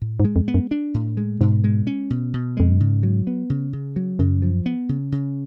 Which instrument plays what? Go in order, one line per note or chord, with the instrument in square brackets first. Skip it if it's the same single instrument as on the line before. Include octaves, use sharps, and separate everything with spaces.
[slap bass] A2
[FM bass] G#2
[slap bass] G#3
[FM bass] F2
[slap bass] B3
[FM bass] F#2
[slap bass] D4
A2
G#3
[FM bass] G#2 [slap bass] B2
[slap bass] G#3
C#4
B2
B2
[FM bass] F2 [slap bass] G#3
[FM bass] F#2
[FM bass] G#2 [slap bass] C#3
[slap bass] F#3
B3
C#3
C#3
F#3
[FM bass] F#2 [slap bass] C#3
[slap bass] F3
B3
C#3
C#3